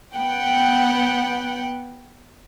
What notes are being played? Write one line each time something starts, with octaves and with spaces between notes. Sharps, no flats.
B3 F#5 G5